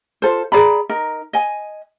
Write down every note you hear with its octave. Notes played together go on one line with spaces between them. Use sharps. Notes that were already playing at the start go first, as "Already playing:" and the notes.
F4 A4 C5
G#4 D5 A#5 B5
D#4 A#4
D#5 G#5